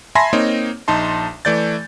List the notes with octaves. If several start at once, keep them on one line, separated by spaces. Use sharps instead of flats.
E5 G#5 A5 B5 C6 A#6
A#3 C4 D#4 C#5
A#1 D#4 A5 C6
E3 A3 D5 G6 A6